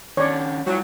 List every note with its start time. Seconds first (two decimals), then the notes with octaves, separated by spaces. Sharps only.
0.17 D#3 C#4 D4 C#5 D5
0.66 F#3 G3 E4 F4